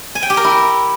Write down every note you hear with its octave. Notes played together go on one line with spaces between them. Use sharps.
G#5
G5
G4
A#4
E4